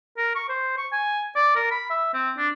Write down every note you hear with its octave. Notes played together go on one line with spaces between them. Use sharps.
A#4
C#6
C5
C#6
G#5
D5
A#4
B5
E5
C4
D4